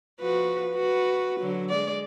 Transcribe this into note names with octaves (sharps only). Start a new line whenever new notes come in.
F3 F#4 B4
F#4 B4
D3 F#3
G#3 D5